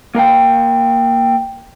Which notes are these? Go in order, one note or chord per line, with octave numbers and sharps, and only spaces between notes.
A#3 A#4 F5 G5